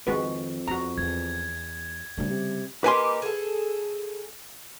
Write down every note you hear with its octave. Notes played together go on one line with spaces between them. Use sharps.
F2 D#3 G#3 F#4 B4
E2 F#4 A#5
E2 G#6
D2 C#3 G3
C3
A#3 D#4 G4 B4 G#5 C6
G#4 A4